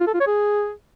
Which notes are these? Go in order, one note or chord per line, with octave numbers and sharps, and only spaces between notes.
F4
A4
F4
C#5
G#4